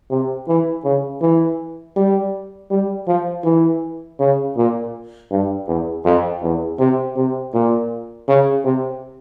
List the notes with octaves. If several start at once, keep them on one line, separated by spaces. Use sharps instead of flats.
C3
E3
C#3
E3
G3
G3
F3
E3
C#3
A#2
G2
E2
F2
E2
C3
C3
A#2
C#3
C3